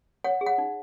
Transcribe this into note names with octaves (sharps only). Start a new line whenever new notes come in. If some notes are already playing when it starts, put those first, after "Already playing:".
C#5 F#5
G#4
F#5
D#4